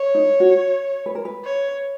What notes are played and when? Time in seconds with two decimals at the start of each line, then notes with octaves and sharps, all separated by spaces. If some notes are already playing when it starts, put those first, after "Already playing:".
Already playing: C#5
0.15 D#4
0.40 F#4
1.06 B4
1.15 A#4
1.25 B4
1.44 C#5